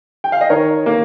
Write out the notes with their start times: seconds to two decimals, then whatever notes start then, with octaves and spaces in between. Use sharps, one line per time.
0.24 G5
0.32 F5
0.41 D#5
0.50 D#3 A#4 C#5
0.86 A#3